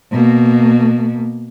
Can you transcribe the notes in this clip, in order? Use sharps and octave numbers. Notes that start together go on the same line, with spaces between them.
B2 A#3